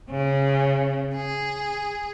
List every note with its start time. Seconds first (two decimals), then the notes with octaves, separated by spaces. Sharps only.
0.10 C#3
1.15 G#4